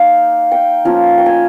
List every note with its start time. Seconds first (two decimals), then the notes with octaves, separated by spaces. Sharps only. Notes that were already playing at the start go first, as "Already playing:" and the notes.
Already playing: A#3 D#4 F5 G5
0.51 G5
0.85 F3 A#3 C#4 F4
1.18 G5
1.26 G#5